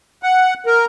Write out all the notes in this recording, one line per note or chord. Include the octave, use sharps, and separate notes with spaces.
F#5
A#4